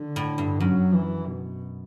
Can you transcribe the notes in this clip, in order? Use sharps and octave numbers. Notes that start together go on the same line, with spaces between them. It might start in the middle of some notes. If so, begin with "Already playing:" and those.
Already playing: D3
A2
G2
F#2 F#3
E3
B2